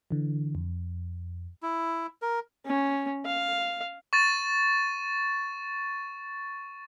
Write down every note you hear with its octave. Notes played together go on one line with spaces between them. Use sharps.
D3 E3
F2
E4
A#4
C#4
F5
C#6 A6 D#7